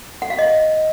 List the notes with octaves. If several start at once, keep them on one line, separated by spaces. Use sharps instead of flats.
F#5
F5
D#5